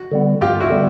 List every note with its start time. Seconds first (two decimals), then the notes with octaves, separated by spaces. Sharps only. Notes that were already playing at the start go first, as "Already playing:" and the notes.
Already playing: F#4
0.11 D3 G3 B3
0.41 G2 F4 G4
0.60 E4 F#4
0.70 D3 G3 B3